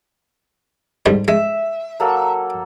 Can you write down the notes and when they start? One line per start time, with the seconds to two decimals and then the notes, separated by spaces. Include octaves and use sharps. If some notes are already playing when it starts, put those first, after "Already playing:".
1.06 G#2 D3 G3
1.28 G#3 E5
2.00 F#3 A#3 A4